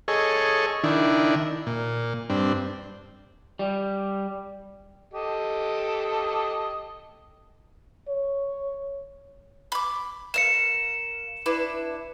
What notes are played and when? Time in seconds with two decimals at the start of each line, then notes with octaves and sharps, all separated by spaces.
0.08 G#4 A4 C#5 D#5
0.84 D#3 D4 E4
1.67 A#2
2.30 G2 C4 D4
3.59 G3
5.14 G4 A4 D#5
8.08 C#5
9.72 B5 D6
10.34 A#4 F5 C#7 E7
11.46 D4 E4 B4